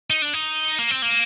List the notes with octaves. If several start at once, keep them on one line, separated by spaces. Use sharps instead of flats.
D#4
D4
D#4
A#3
C4
A#3